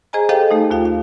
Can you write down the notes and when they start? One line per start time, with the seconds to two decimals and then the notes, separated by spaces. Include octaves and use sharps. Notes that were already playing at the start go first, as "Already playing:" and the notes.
0.13 G#4 C5 D#5 G#5 A#5
0.29 G4 A4 C5 D#5 F5 G5
0.51 A3 D#4
0.71 D#2 F4 F5
0.86 F5